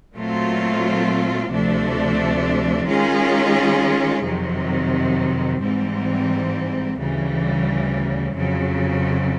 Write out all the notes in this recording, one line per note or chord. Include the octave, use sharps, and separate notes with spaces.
A#2 F#3 A3 C4 F4
D2 C3 F3 A3 D4
D#3 G#3 C#4 F4 G#4
F2 C3 D#3 F#3
G#2 E3 G3 C4
D2 C#3 E3 G3
F2 C#3 F#3